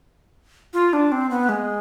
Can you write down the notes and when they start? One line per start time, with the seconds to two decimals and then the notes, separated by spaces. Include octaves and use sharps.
0.74 F4
0.93 D4
1.12 C4
1.31 B3
1.49 G#3